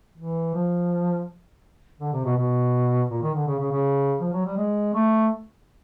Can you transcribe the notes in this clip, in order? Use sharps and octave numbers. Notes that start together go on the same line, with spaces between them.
E3
F3
D3
C3
B2
B2
A#2
D#3
D3
C#3
C#3
C#3
F3
F#3
G3
G#3
A3